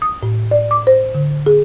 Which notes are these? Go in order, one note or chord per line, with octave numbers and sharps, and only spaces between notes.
D#6
A2
D5
D6
C5
D3
G#4